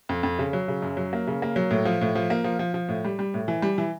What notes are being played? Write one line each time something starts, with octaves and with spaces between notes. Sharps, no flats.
F2
F2
C#3
F#3
C#3
F#2
F#3
A#3
C#3
A#3
F#3
A2
F3
A2
F3
A#3
F3
F3
F3
A2
G3
G3
A2
E3
G3
E3